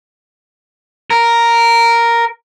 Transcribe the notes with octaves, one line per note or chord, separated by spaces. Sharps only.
A#4